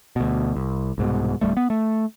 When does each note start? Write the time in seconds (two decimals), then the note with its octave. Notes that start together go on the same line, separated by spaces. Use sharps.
0.16 D2 B2
0.55 C2
0.98 C2 G#2 B2
1.41 D1 F2 G3 A3
1.57 B3
1.70 A3